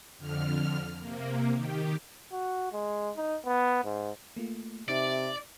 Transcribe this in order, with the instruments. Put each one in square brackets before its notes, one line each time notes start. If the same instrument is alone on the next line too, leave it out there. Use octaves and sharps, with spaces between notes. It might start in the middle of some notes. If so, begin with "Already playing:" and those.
[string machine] F2 D3 F6
C3 A#3
D#3 G4
[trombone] F#4
G#3
D#4
B3
G#2
[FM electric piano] A3 A#3 F4
[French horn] C3 [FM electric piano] C4 D#4 [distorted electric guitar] D5 [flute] E5